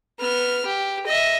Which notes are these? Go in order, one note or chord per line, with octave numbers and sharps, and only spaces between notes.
B3 F6
G4
D#5 E5